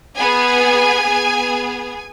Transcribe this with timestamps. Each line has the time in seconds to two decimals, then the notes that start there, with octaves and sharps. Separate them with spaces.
0.17 B3 G#4 G#5
1.05 B3 G#4